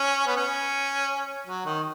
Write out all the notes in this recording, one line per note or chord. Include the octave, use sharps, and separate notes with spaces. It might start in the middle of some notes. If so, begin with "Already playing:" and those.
Already playing: C#4
B3
C#4
F#3
D#3